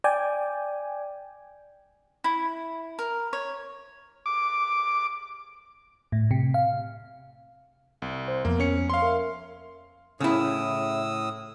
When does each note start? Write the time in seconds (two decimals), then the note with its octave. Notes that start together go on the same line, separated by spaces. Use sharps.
0.04 D5 G5 G#5
2.24 E4
2.99 A#4
3.33 C#5
4.26 D6
6.12 A2
6.31 C3
6.54 F5
8.02 C2
8.28 C5
8.45 F2 F3 A#3 B3
8.60 C#4 C#7
8.90 F5 C6
9.02 A#4 E5
10.20 A2 C#3 E4 D#6 E6